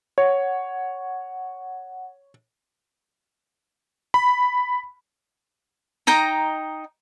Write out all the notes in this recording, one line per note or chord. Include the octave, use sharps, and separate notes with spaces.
C#5 F#5
B5
D#4 D#5 G5 A#5